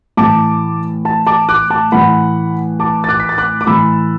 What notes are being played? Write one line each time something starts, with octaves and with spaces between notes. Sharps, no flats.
A2 E3 A5 D6
A5
A5 D6
D6 F#6
A5 D6
A2 E3 F#5 B5
A5 D6
A6
D6 F#6
B6
A6
D6 F#6
D6
A2 E3 B5 E6